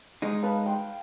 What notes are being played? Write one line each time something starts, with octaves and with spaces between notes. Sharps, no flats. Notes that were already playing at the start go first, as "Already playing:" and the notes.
G#3 D#4
B4 F5 A5
G5 C6